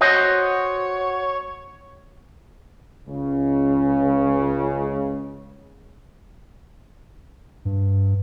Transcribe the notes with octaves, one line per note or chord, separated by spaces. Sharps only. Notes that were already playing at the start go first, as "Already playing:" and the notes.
F#4 C5 C#5 D#5
C#2 C#3
G2